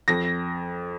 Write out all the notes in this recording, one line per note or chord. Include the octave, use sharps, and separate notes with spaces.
F2 A#6